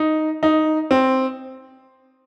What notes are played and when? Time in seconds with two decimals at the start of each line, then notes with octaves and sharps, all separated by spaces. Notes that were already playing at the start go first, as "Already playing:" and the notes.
Already playing: D#4
0.43 D#4
0.91 C4